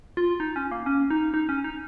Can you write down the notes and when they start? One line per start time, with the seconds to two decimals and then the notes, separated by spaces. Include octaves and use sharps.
0.17 F4
0.40 D#4
0.56 C#4
0.71 A#3
0.86 C#4
1.10 D#4
1.34 D#4
1.49 C#4
1.64 D#4